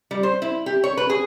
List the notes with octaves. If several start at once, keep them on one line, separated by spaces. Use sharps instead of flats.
G3
C5
E4
G4
C#5
B4
G#4